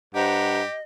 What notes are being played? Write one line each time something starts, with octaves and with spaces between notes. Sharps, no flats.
G2 G4 C5 D#5 F#5 A#5